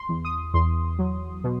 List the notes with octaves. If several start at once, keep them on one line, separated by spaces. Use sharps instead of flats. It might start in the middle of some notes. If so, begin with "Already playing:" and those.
Already playing: C6
E2
D#6
E2 C6
F#3
B2